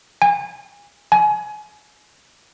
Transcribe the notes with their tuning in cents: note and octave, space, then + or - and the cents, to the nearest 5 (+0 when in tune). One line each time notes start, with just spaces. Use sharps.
G#5 -30
G#5 +25